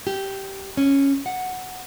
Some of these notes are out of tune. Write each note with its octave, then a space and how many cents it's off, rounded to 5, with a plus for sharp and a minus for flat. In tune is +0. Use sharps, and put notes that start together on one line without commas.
G4 -10
C#4 -5
F#5 -5